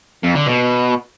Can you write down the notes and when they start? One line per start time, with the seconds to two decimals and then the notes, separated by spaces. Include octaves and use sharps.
0.24 F2
0.35 D3
0.47 B2